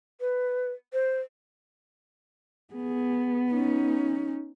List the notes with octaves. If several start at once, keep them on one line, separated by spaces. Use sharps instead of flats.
B4
C5
B3 G#4
C#4 D#4